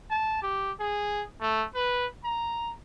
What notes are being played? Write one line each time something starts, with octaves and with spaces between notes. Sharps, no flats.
A5
G4
G#4
A3
B4
A#5